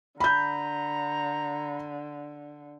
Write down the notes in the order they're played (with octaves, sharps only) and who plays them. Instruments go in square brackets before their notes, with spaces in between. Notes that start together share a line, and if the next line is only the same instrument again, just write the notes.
[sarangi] D3 [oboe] A#5 [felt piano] B5 G6